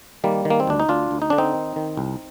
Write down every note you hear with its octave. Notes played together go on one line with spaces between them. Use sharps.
D#3 G3 A#3
D#3
A#3
C4
D2 D4
D#4
D2 D4 F4
D2
D#4
D3 D4
C4 D#4
D#3
D#3
C2